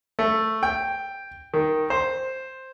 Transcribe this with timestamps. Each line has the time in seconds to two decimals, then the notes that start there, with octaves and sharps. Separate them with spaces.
0.19 A3
0.63 G5
1.54 D#3
1.90 C5